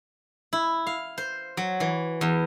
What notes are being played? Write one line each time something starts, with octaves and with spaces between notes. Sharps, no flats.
E4
F5
C5
F#3
E3
E2